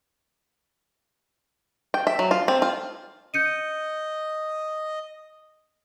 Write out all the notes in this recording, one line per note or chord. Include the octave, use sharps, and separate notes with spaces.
G5
E5
F#3
F4
C4
F4
D#5 G6 C#7 D#7